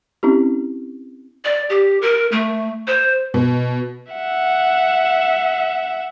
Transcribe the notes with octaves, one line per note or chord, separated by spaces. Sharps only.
C4 C#4 E4 G4
D5
G4
A#4
A3
C5
B2
E5 F#5